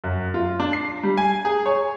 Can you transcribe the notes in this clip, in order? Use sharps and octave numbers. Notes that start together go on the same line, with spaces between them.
F#2
F4
D4
C7
G3
G#5
G#4
C#5